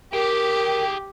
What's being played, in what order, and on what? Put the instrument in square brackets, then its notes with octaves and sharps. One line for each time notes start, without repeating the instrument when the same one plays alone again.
[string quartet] G4 [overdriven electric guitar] G#4 G5 [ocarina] A#4